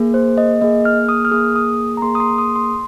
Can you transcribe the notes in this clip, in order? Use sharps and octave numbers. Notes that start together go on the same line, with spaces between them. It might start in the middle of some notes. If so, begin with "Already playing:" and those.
Already playing: A#3 G#4
C5
D#5
A#3 G#4 D#5
F6
D#6
F6
A#3 G#4 D#6
D#6
A#5
A#3 G#4 C6
D#6
C6
D#6
C6